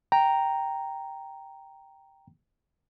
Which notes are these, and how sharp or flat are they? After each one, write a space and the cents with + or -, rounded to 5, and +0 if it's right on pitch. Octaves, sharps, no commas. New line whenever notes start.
G5 +0 A#5 +0